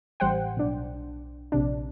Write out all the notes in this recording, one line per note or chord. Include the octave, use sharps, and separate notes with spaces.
A1 G3 C5 F#5 G5
B1 D4
A#1 C3 D4